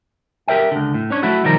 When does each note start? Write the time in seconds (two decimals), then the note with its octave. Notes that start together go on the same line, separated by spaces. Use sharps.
0.48 G4 A#4 C#5 E5 G5
0.71 C#2 D3
0.94 A2
1.10 C#4 D4 C#5
1.22 F#3 A3 E4 F#4 A4
1.44 B1 D#3 F3 G3 A#4